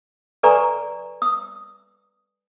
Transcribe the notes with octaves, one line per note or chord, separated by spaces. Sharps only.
A4 B4 D5 G#5 A#5 C#6
D#6